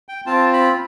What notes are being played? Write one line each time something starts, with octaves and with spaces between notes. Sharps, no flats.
G5
C4 F4 A5
B5